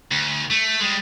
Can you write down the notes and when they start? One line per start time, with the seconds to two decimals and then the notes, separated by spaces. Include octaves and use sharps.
0.11 D2
0.50 A3
0.80 G3 G#3